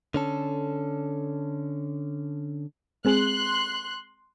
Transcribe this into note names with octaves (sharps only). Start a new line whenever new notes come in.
D3 C#4 A4
G#3 C4 G#4 C6 F#6